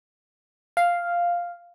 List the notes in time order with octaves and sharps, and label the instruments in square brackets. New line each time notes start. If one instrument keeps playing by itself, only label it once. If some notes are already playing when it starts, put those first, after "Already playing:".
[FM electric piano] F5